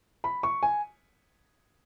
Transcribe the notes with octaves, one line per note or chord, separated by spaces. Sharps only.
B5
C#6
G#5